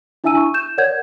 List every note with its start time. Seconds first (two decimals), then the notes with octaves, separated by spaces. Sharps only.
0.24 D4 E4 E5 G#5 E6 D#7
0.37 C#6
0.54 G6 E7
0.78 A#4 C#5 D5 F#5 G6 G#6